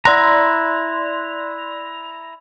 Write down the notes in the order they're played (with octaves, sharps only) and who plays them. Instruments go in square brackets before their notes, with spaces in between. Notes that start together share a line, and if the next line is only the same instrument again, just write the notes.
[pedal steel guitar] E4 A#5 [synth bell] D5 C6 F#6